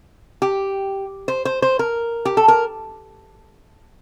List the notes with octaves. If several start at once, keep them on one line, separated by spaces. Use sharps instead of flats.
G4
C5
C5
C5
A#4
G4
A4
A#4